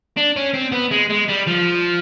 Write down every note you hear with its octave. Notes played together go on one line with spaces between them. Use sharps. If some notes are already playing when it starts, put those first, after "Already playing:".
D4
C#4
C4
B3
G#3
G#3
G3
F3